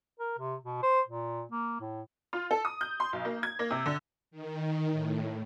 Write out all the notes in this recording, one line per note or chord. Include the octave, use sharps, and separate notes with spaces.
A#4
C3
B2
C5
A#2
A#3
A2
F4
A4
D#6
G6
C6
B1
A#3
G#6
A#3
C3
D3
D#3
A2